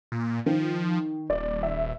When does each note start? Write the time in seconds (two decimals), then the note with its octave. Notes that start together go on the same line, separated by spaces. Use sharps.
0.12 A#2
0.46 D#3 F3
1.30 D#1 D5
1.63 E5